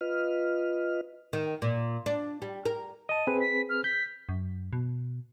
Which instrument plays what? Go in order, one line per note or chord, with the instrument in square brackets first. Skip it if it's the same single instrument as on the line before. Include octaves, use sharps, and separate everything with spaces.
[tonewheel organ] F4 B4 D#5 F6
[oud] D#3
A#2
D4
G3
A#4
[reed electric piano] D#5 A5 [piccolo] D#7
[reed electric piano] C4 G#4 B4
[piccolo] B6
F6
[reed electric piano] G6 [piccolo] B6
[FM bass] F#2
B2